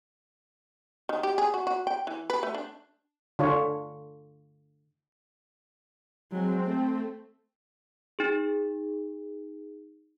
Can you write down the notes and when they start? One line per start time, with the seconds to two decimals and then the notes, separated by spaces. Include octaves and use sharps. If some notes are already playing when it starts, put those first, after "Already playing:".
1.09 D#3
1.23 G4
1.38 G#4
1.54 F#4
1.67 F#4
1.87 G5
2.07 E3
2.30 B4
2.43 A3
2.54 D4
3.39 D3 F4 C#5
6.32 F#3 G#3 C4
6.65 A3
8.19 D#4 G#4